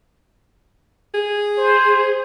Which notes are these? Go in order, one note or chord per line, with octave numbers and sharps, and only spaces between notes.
G#4
C5